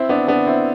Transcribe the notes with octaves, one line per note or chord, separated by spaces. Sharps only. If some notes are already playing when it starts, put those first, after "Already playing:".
Already playing: C4 E4
B3 D4
B3 D4
C4 E4